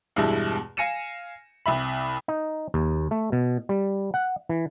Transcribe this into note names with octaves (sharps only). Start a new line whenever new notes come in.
E2 G2 B2 G3 G#3 E4
F5 G#5 A#6 C#7 D#7 E7
C2 E5 B5
D#4
D#2
A3
B2
G3
F#5
E3